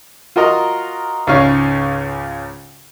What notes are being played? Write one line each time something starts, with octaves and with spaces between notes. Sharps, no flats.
F4 F#4 A#4 D#5 A#5
C#2 G#2 C#3 C#4 F5 C#6